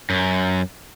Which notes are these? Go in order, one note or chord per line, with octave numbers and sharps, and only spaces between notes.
F#2